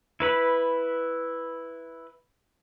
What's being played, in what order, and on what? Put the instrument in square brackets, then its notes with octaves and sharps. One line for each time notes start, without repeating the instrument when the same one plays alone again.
[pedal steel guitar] E4 B4 B5